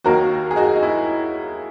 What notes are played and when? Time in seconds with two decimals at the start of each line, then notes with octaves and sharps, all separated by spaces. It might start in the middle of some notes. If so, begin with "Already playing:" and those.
0.04 D#2 D#3 F#3 A#3 F#4 A#4
0.51 G#4
0.56 D#4 F#4
0.76 D#4
0.83 E4